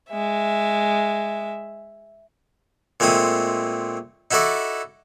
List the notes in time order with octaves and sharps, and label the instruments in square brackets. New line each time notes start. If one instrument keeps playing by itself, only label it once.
[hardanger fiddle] G#3 E5
[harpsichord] A#2 G#3 A3 C4 D#6
D#4 E4 F#4 A4 D5